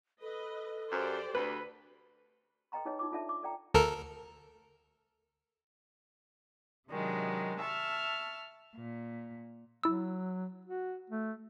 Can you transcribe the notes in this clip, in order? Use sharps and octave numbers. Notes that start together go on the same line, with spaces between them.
A4 B4 D#5
F#2 G4 C5 D5
D2 B4
A4 B4 D#5 G5 A#5 C6
D#4 G#4 B4 C#5 D#5
D#4 F4 D6
D4 F4 A4 D5 E5 A5
D6
A4 D5 G5 A#5
D2 A4 A#4
C3 D#3 F#3 G#3 D4
E5 A5 C#6 F6
A#2
F#3 E4 E6
F#4
A3